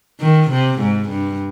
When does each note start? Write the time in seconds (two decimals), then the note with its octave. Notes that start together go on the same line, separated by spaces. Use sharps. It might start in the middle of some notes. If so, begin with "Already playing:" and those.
0.20 D#3
0.50 C3
0.79 G#2
1.09 G2